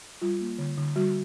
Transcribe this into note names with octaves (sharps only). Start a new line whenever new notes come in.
G3 F4
A#3
D3
D3
G3 F#4